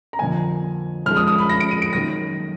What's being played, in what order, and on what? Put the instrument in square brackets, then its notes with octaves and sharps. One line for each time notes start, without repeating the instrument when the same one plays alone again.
[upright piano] A#5
F2 D3 F3 A#3 G#5
F2 F3 G#3 F6
D#6
D#6
B5
A#6
D7
D#7
D7
F#2 D#3 A#3 A#6